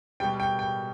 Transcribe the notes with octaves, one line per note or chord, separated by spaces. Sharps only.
B2 G3 G5
G5
G5